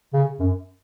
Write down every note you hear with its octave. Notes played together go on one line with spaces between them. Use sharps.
C#3
F#2